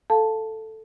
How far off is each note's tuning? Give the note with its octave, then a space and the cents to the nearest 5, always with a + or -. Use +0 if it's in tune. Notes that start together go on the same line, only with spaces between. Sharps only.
A4 +0 F5 +0 A5 +0